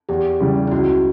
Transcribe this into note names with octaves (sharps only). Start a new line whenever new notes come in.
E2 G4
C#3 E3 G3
E4
C#2 F#4